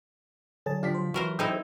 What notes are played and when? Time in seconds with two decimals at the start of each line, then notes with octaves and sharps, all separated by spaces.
0.66 D3 F#3 G#4 A5
0.83 F3 D4 G4 F5 B6
0.94 C5
1.14 E3 F#3 F#4 A#4 C5
1.39 C4 D#4 E4 G#4 A4 C5 G5